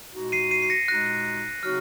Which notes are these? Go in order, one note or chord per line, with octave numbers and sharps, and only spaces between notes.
A#2 G#3 D#4 F#4
C7 D#7
C7 D#7
C7
A#6 C#7
A#2 G#3 D#4 F#4 F#6 A#6
C#3 F#3 C4 D#4 F#4 F6